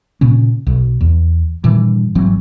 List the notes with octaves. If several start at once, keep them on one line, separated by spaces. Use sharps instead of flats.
A#2 C#3 C#4
B1
E2
G2 A#2 D#3 E3
G#1 E3 F#3 C4